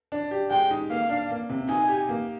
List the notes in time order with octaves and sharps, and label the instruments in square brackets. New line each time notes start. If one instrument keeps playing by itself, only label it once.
[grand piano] D4
G4
[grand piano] G#3 [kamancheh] G5
[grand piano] D#4
[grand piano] A#3 [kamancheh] F5
[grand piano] D4
A#3
C3
[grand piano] D#4 [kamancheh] G#5
[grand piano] G4
A#3